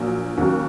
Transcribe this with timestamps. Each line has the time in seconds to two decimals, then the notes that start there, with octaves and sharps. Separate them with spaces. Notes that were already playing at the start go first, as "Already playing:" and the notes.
Already playing: A#1 A#2 F#3
0.38 D#2 C#3 F#3